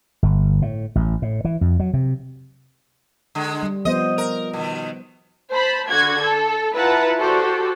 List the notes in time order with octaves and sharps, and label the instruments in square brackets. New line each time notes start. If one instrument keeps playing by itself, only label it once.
[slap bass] G1
A2
A1
A2
E3
F2
F#3
C3
[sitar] D3 G#3
[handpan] G3
[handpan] F3 B3 C5 [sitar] D#5
[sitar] A#4
B2 D#3
[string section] C5 A5 B5
D3 F#4 G#6
A4
E4 F4 B4 F#5 A5 A#5
F#4 G4 A4 C5 D5